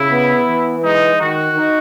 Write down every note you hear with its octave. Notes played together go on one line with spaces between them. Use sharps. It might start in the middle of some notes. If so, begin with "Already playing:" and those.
Already playing: C#3 E4
B3
E3
G#3 D#4
D#3 F#4
D#4